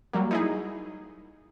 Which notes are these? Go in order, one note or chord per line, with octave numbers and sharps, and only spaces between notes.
F#3 G3 A#3
D#4 E4 G#4